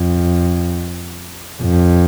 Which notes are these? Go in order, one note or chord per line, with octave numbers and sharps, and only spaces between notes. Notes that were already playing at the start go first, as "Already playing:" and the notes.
Already playing: F2
F2